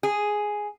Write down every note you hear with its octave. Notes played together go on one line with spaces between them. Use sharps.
G#4